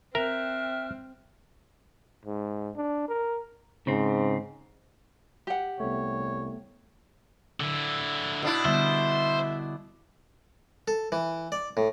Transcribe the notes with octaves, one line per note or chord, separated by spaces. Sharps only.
C4 A#4 E5 G5 F6 F#6
G#2
D4
A#4
G#2 C#3 C4
G4 F#5
C2 A3 B3 C#5
D3 E4
B2 D4 E4
D3 G3 B3 C5 E5
A4
E3
D5
A2